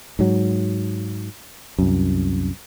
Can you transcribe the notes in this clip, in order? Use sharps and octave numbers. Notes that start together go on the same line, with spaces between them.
G#2 F#3
C2 F#2